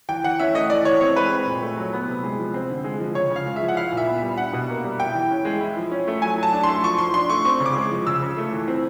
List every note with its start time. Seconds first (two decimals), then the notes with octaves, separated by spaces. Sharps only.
0.09 E3 G5
0.24 E3 F#5
0.39 C#4 E5
0.54 A3 D#5
0.70 E3 D5
0.85 E3 C#5
1.01 C4 C#5
1.16 G#3 B4
1.31 C4
1.47 A#2
1.62 A3
1.77 F#3
1.93 B3
2.08 C3
2.23 G#3
2.39 F3
2.54 C4
2.70 D3
2.84 G#3
3.00 F3
3.15 C#3 C#5
3.30 C#3
3.36 F5
3.46 G#3
3.56 E5
3.61 F3
3.68 F#5
3.77 E4 F5
3.92 A#2
3.97 E5
4.07 B3
4.18 E5
4.22 G3
4.38 D4 F#5
4.53 B2
4.69 A#3
4.84 G3
5.00 E4 G5
5.15 E3
5.31 C#4
5.45 G#3
5.61 E4
5.77 F3
5.91 C#4
6.07 A3
6.22 F#3 G#5
6.38 F#3 A5
6.53 D4
6.63 C6
6.68 A3
6.84 F3 C#6
6.98 F3 C6
7.14 D4 C6
7.29 A3 C#6
7.45 C4 C#6
7.60 C#3
7.66 D6
7.76 G#3
7.91 F3
8.07 C#3 E6
8.22 C#3
8.37 A3
8.53 E3
8.68 C4